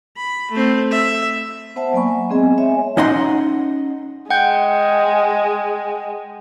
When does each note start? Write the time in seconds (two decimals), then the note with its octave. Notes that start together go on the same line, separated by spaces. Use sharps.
0.17 B5
0.51 A3 C4
0.91 E5
1.76 B3 C5 E5 F#5 A5
1.93 F#3 A#3 D5 G#5 B5 C#6
2.29 G#3 B3 C4 G#4 D#5 G#5
2.58 C#5 E5 G#5
2.97 C#4 D#4 D#5 F#5 C6
4.30 G#3 F#5 G5 G6